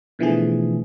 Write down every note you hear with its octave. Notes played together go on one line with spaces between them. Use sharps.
B2 D3 E3 F3 A3 G#4